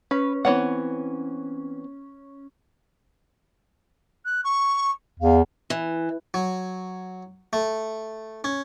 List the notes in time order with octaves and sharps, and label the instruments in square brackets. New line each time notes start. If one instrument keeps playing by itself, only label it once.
[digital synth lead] C#4 [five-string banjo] B4
[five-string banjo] E3 C#5 F#5 [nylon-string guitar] B3 C4
[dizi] F#6
C#6
[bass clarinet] E2 [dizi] F5
[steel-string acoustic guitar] E3
[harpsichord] F#3
A3
C#4